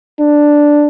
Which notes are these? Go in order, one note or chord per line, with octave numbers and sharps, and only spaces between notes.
D4